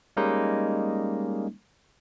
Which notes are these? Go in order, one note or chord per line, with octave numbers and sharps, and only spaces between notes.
G3 G#3 A#3 C#4 D#4